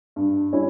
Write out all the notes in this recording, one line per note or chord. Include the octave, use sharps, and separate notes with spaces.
G2
G3 C#4 E4